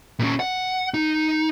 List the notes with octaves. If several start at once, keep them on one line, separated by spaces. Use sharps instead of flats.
A#2 C#4
F#5
D#4